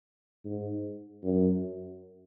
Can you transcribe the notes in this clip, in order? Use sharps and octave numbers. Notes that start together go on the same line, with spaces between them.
G#2
F#2